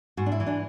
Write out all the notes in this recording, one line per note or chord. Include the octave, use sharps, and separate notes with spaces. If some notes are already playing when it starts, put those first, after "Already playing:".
G#2 F#4
D4
E4
E3
D4